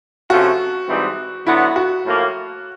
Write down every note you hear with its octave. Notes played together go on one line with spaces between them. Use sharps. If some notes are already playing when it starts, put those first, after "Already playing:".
C3 F3 A3 C#4 F#4
G#2 E3 G3 C4 D#4
D3 F#3 B3 E4
F#4
A2 F3 A#3